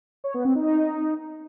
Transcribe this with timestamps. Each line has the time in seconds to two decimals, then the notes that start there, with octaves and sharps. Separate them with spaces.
0.24 C#5
0.34 B3
0.45 C4
0.55 D#4